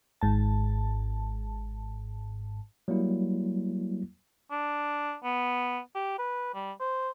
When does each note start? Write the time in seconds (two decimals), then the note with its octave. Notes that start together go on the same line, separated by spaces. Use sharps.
0.21 G#1 G#2 A5
2.88 F#3 G3 A#3 E4
4.51 D4
5.24 B3
5.95 G4
6.19 B4
6.54 G3
6.80 C5